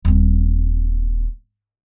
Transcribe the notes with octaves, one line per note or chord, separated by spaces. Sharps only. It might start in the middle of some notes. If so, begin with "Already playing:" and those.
D#1 C4